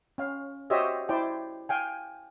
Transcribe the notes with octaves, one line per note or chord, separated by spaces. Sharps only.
C#4 F5
F#4 G4 C5 C#5 D#5 E5
E4 C5 D5 G5
F5 G5 G#5